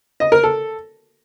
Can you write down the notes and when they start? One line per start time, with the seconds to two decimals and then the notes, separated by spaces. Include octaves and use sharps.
0.20 D#5
0.32 A#4
0.43 A4